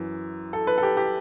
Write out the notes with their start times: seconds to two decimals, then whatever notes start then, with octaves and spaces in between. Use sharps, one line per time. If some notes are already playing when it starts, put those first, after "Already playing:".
Already playing: F#2 E3
0.53 A4
0.67 B4
0.78 A4
0.83 G4
0.97 G4